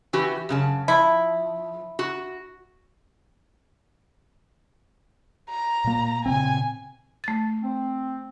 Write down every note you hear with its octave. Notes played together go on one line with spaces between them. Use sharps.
E3 F#4 G4
F#2 C#3 A5
F3 E4
F#4
A#5
A#2 A#3
A#2 C#3 C4 G#5
A3 A6
C4